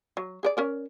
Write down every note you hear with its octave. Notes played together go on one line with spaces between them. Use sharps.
F#3
G#4 A#4 D5
C#4 A#4 D5